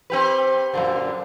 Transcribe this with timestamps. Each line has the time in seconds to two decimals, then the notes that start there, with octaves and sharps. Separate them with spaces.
0.10 C4 G4 B4
0.74 F#2 A#2 D3